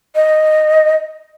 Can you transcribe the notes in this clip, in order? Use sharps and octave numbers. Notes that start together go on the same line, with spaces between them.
D#5